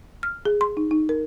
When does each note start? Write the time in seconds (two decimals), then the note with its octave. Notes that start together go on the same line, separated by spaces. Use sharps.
0.23 F6
0.45 G#4
0.61 C6
0.77 D#4
0.91 D#4
1.09 A#4